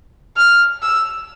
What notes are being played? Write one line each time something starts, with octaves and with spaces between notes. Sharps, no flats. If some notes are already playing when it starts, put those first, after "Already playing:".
F6
E6